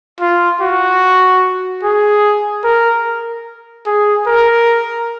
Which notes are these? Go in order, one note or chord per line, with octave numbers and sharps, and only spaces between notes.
F4
F#4
G#4
A#4
G#4
A#4